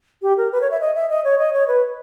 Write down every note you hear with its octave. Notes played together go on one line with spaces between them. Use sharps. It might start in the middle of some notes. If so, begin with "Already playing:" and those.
G4
A#4
B4
C#5
E5
D#5
E5
D#5
C#5
D#5
C#5
B4